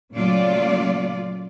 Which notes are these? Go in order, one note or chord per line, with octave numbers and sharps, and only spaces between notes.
A#2 C#3 F#3 A3 F4 D5